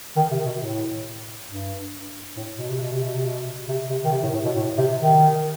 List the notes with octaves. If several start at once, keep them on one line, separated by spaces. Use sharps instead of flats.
D#3
C3
B2
A2
G2
A2
B2
C3
B2
C3
B2
C3
B2
C3
C3
D#3
C3
A2
A2
B2
A2
C3
D#3